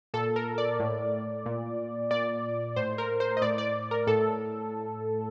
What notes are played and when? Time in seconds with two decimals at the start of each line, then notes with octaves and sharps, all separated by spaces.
0.14 A#2 A4
0.36 A#4
0.58 D5
0.80 A2
1.46 A#2
2.11 A#2 D5
2.76 A2 C5
2.98 A#4
3.20 C5
3.37 D#5
3.42 A2 D5
3.58 D5
3.91 A#4
4.07 A2 A4